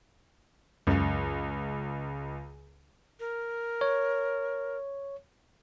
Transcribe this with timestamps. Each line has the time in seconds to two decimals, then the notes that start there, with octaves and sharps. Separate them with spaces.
0.87 C#2 F#2 C#3
3.20 A#4
3.81 C#5